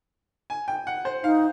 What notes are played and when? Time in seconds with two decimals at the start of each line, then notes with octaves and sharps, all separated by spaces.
0.50 G#5
0.68 G5
0.87 F#5
1.05 C5
1.24 D#4 F5